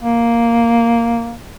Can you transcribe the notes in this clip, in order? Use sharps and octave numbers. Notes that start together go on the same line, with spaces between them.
A#3